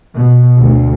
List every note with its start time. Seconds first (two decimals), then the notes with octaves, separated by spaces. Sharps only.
0.14 B2
0.59 D2